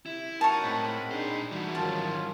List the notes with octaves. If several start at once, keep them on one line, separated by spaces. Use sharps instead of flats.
C3 E4
F#2 D#4 A#4 C#5 F#5 A5
A2 G#3 C4 B5
A#2 D4 D#4 G#4 C5
E3 G3 A3 F#4
G#2 D#3 F#3 C#4 F4 A5